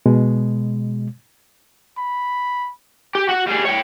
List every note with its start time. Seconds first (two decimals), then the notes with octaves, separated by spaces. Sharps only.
0.06 B2 G#3
1.98 B5
3.15 G4
3.28 F#4 F#5
3.47 G3 G#4
3.65 C#5 G5